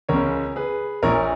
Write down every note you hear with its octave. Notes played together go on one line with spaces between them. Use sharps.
C#2 C#3 A#4 C#5
G#4 B4
A#1 A#2 A#4 C#5